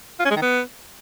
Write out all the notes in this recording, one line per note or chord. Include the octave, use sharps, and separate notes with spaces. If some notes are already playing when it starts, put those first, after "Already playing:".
F4
C#4
G#3
D#3
B3